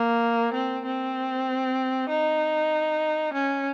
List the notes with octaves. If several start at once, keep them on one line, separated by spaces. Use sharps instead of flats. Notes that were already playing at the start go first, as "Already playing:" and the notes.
Already playing: A#3
C4
C4
D#4
C#4